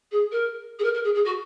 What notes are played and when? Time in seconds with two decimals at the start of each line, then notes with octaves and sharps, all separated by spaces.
0.11 G#4
0.31 A#4
0.79 G#4
0.83 A#4
0.94 A#4
1.04 G#4
1.14 G#4
1.24 F#4